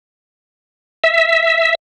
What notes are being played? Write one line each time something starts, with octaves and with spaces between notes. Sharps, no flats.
E5